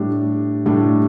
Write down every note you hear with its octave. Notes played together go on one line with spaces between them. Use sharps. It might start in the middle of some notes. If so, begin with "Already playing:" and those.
Already playing: A2 G3 D4
A2 G3 D4